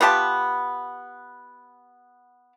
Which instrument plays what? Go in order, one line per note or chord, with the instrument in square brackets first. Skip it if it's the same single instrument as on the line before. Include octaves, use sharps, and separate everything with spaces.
[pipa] B3 F4 G4 A5